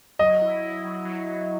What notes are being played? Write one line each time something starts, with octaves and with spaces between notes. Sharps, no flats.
F#3 D#5
E4
E4
F#3
F#3
F#3